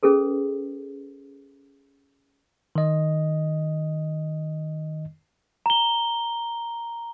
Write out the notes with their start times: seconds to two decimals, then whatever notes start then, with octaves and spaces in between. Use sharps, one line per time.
0.03 C#4 G#4 A4 B4
2.75 D#3 D#5
5.66 A#5 G7